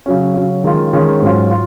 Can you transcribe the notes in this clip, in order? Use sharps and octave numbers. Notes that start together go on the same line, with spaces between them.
C#3 F#3 C#4
C#3 F#3 C#4
D#3 G#3 C#4 F4
D#3 G#3 C#4 F4
G#2 F#3 C#4 F4
F4